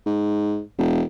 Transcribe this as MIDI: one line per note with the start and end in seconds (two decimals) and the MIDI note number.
0.06 0.61 44
0.78 1.03 28